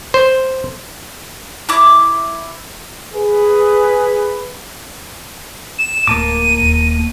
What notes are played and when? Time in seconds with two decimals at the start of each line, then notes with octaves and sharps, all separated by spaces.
0.14 C5
1.69 E4 D6
3.13 G#4 B4
5.79 E7
6.07 D1 A2 A#3 A5 D6 D#7
6.61 D#1